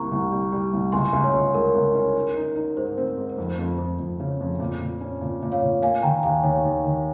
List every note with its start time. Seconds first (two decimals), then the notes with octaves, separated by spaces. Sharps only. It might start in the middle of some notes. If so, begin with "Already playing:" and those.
Already playing: C2 A#3 A#5 C#6
0.11 C2
0.31 G3
0.52 G3
0.73 C2
0.92 C#2 G#5 C6
1.13 C#2
1.24 C#5
1.33 C#2
1.54 G#3 A#4
1.75 C#2
1.94 C#4
2.16 D#4
2.36 D#4
2.56 D#4
2.77 G#2 C5
2.98 C4
3.17 G#2
3.38 F2
3.59 F2
3.78 F2
3.99 F2
4.20 C#3
4.40 F2
4.60 A#2
4.81 A#2
5.01 C#4
5.21 A#2
5.42 A#2
5.52 C#5 F5
5.62 A#2
5.82 A#3 F5 G#5
6.02 D#3 G5 A#5
6.23 D#2 F5 G#5
6.43 D#2 C#5
6.65 D#2
6.84 D#3